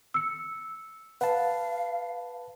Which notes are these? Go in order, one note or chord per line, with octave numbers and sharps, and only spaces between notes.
E6 C#7
B4 F5 F#5 A5